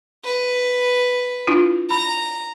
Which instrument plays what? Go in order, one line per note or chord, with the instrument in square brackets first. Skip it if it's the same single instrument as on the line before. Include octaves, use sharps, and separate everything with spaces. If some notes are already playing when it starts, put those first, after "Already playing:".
[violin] B4
[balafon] D4 E4 F4
[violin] A#5 [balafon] B5